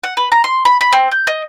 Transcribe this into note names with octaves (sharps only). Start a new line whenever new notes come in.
F#5
B4
A#5
C6
B5
B5
C4
G6
D#5